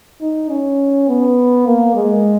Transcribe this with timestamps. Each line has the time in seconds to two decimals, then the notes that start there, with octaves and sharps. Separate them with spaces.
0.21 D#4
0.49 C#4
1.08 B3
1.66 A#3
1.95 G#3